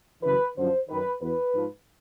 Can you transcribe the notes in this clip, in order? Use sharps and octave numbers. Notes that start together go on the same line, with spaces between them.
F#2 C#3 E3 B4
F#2 D3 F3 C5
F#2 D#3 B4
E2 B2 B4
G#2 F3